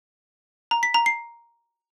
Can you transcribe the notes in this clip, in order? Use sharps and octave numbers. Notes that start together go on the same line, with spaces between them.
A#5
B6
A#5
C7